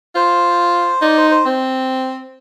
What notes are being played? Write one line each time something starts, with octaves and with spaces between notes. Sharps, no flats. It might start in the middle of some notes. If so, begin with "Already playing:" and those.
F4 C5
D#4 D5
C5
C5
C4